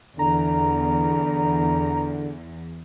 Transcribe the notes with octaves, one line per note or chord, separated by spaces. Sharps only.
E2 D3 A#5